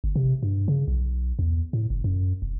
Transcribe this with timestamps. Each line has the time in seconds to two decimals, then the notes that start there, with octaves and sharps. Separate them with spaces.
0.04 G1
0.16 C3
0.43 G2
0.68 C#3
0.88 B1
1.39 E2
1.73 A2
1.90 F#1
2.04 F#2
2.42 E1